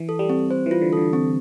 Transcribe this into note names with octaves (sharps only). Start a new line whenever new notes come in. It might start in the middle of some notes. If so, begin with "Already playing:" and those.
Already playing: E3
A4
G3
C4
C5
E3
F4
D3
D3 A4
C4